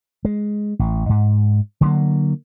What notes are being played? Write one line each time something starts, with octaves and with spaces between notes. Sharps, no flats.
G#3
A1
G#2
D3 F#3 A3 A#3